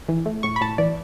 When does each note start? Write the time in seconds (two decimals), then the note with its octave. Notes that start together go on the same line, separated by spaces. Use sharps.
0.09 E3
0.26 A3
0.43 A2 C#6
0.56 B5
0.61 A2 A5
0.78 E3 D5